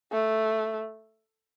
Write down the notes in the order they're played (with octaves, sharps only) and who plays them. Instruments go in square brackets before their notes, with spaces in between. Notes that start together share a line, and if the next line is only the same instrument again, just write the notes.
[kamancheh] A3